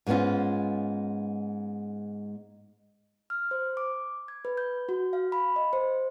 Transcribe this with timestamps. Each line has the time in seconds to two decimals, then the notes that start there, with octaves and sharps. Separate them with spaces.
0.07 G#2 G#3 B3 C#4 F4
3.30 F6
3.51 C5
3.77 D6
4.28 G#6
4.45 B4
4.57 G6
4.89 F#4
5.13 F5
5.32 B5
5.56 D#5
5.73 C5